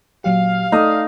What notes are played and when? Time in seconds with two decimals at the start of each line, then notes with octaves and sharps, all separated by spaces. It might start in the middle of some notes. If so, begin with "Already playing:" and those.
0.24 A#2 F#3 G4 F5
0.72 A3 D#4 D5 D#5 D#6